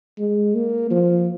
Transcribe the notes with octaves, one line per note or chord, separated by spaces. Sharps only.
G#3
A#3
F3